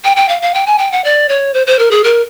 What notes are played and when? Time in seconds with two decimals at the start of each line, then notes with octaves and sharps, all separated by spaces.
0.04 G5
0.17 G5
0.29 F5
0.42 F5
0.54 G5
0.66 G#5
0.78 G5
0.92 F#5
1.04 D5
1.29 C#5
1.54 C5
1.67 C5
1.79 A#4
1.91 G#4
2.04 A#4